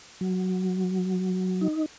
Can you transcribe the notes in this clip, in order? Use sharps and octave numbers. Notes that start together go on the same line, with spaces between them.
F#3
D#4